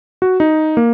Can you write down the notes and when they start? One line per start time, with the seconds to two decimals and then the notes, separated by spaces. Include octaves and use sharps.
0.22 F#4
0.40 D#4
0.77 A#3